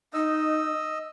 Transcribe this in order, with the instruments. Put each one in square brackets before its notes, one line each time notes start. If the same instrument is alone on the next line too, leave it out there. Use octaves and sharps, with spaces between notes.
[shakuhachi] D#4 [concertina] D#5 E6